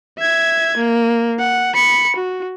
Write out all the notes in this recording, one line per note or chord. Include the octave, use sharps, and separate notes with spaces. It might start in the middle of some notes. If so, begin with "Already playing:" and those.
E5 G#6
A#3
F#5
B5 C#7
F#4